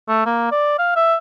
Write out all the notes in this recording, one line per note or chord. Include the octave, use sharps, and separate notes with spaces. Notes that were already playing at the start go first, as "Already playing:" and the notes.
A3
A#3
D5
F5
E5